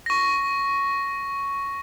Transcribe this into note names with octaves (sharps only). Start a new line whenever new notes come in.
C#6 A#6